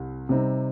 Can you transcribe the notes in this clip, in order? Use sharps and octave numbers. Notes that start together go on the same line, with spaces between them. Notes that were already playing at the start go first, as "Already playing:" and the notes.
Already playing: C2 C3
C3 G3 C4 D#4